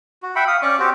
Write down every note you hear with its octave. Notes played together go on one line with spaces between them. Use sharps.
F#4
E5 F#5 G5 B5
F5 D#6
C#4 D5 C#6 D6
C4 F#4 G4